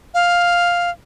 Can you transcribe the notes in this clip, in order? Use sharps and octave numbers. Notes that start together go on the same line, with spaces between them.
F5